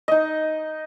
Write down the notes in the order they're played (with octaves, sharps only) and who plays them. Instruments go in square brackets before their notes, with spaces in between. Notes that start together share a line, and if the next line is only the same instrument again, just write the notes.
[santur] D#4 D#5